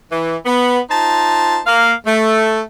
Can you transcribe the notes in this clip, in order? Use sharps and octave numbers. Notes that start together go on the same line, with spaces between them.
E3
B3
D#4 F4 C5 A5
A#3 F5
A3